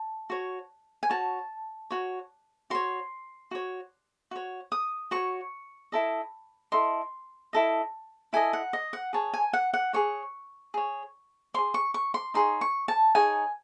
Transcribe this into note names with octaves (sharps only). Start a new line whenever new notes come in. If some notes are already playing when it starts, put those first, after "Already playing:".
Already playing: A5
F#4 C#5
G#5
F#4 C#5 A5
F#4 C#5
F#4 C#5 C6
F#4 C#5
F#4 C#5
D#6
F#4 C#5 C#6
E4 A4 D#5
E4 A4 D#5 C6
E4 A4 D#5
E4 A4 D#5 G#5
F#5
D#5
F#5
G#4 C#5 A5
G#5
F#5
F#5
G#4 C#5 C#6
G#4 C#5
G#4 C#5 C6
C#6
C#6
C6
D#4 G#4 C#5 C6
C#6
A5
D#4 G#4 C#5 G#5